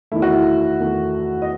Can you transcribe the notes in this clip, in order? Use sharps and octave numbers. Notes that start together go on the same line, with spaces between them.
E2 D#3 A3 E4
F#4
E4
E2 D#3 A3
D#5